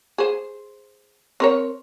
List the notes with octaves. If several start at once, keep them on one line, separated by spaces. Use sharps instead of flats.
G#4 C5
C4 A#4 C#5